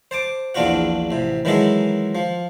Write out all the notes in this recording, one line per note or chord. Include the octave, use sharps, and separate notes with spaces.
C5 A5 D6
A#1 E2 D4 F4 F#4 F#5
A1 C3
D#3 E3 F#3 G#3 G#4 A4
F3